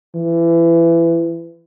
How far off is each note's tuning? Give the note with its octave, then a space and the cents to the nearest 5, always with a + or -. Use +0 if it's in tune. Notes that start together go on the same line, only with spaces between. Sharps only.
E3 +25